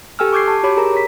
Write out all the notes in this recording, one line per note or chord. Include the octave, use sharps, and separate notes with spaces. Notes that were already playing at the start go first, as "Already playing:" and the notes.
G4 A4 G5 G#5 E6 F6
C#6 D6 G6 G#6 C7
A5
F#4 G4 C#5 B5 D6
G#4 A#4 A#5
C#5 B6